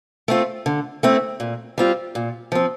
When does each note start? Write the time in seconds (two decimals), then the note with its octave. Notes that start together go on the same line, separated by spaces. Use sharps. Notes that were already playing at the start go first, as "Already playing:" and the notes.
0.28 A3 C4 F4
0.66 D3
1.03 A3 C4 E4
1.40 A#2
1.78 G3 C4 F4
2.15 A#2
2.52 F3 C4